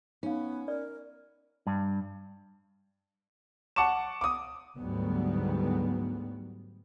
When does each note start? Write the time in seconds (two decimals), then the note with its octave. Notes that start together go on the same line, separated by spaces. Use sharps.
0.23 B3 C#4 D#4 F5
0.68 A#4 D5
1.67 G2
3.76 F#5 A5 C#6 D6 E7
4.21 D6 D#6
4.78 D2 G#2 F#3 G3 B3